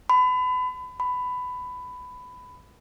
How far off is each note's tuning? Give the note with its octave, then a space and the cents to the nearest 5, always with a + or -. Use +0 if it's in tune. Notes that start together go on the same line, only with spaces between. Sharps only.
B5 +30
B5 +15